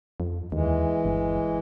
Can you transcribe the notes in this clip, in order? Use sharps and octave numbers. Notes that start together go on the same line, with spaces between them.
F2
D#2 E3 G#3
G1